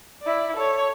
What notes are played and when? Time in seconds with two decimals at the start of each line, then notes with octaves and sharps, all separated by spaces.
0.22 E4 D5
0.56 A4 C#5